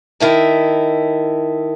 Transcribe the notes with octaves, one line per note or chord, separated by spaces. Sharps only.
D#3 E4 A4